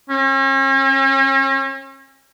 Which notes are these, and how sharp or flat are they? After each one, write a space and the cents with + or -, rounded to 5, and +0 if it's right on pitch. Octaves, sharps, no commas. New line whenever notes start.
C#4 -40